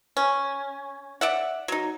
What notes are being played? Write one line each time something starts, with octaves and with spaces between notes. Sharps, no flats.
C#4
D5 E5 F#5
F#3 D#4